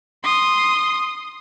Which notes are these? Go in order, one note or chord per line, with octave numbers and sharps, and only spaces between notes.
C6 D#6